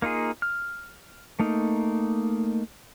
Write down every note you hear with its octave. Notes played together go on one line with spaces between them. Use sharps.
A#3 D#4 F4 G#4
F6
A3 A#3 D#4